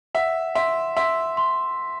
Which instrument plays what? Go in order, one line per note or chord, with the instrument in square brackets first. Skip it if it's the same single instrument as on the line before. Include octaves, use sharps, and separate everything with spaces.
[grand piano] E5 [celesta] F#5
[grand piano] E5 [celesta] C6
[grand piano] E5 [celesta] C6
[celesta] C6